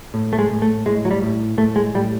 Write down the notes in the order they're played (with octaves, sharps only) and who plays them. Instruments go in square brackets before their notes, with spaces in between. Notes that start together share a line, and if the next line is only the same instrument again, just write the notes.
[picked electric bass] A2
A3
G#3
A2
A3
A2 G#3
F#3
G3
A2
A2 A3
G#3
A2 G3